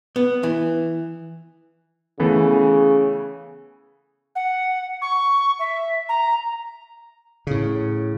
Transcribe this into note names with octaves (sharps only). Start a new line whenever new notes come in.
B3
E3
C#3 E3 A3 B3
F#5
C#6
E5
A#5
A2 C#3